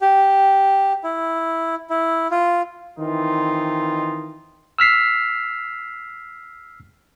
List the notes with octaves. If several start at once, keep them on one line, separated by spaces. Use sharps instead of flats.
G4
E4
E4
F4
D#3 E3 C4 D#4 F4
E6 F6 B6 C7